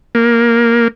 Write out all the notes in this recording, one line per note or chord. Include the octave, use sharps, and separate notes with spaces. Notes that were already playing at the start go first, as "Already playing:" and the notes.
A#3